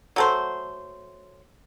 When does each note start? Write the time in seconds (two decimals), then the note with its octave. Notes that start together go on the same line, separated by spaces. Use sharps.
0.16 F#3 A3 C5